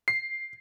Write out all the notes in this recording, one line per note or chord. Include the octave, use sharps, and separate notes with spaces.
C7